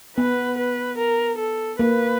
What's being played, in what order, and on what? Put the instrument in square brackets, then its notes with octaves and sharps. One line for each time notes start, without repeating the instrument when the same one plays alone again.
[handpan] B3 [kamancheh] B4
[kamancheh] B4
A#4
A4
[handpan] A#3 [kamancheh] B4